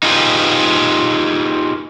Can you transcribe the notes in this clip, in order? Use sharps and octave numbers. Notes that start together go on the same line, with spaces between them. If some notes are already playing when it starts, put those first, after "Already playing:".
D#4 F4 G4 G#4 B4